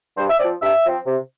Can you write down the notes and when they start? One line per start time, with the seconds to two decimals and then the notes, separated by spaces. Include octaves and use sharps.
0.17 G2 C5
0.29 E5
0.39 F3 C4 D5
0.61 G2 E5
0.85 F3 C4
1.06 C3